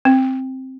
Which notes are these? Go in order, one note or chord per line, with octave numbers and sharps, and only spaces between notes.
C4